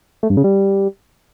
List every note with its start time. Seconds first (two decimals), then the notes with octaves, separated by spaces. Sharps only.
0.23 A3
0.30 G2
0.37 C#3
0.44 G3